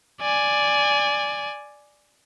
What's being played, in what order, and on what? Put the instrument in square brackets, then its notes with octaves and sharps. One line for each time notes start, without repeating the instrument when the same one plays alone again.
[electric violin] D5 G#5